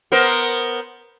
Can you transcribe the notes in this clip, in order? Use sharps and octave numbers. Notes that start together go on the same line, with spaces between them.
B3 A#4 C5